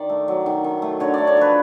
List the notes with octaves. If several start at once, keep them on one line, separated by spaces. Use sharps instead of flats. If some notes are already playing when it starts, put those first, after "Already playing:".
Already playing: D#3 D5
A3
F#3
D#3
D#3
A3
D3 C#5
A3 D5
C#5
F3 B4